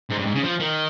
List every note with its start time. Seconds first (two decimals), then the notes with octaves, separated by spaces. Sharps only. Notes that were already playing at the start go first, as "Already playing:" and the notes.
0.10 G#2
0.19 G2
0.26 G#2
0.35 C#3
0.44 F3
0.60 D#3